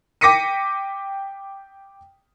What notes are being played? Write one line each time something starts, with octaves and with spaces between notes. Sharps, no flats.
G5 D6 A#6 B6 C#7 D#7